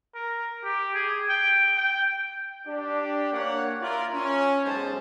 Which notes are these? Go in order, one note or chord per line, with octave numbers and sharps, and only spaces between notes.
A#4
G4
G#4
G5
G5
D4 G4
A#3 C#5 F5 F#5
E4 F4 A#4 D5
C#4
B1 G#3 C5 A5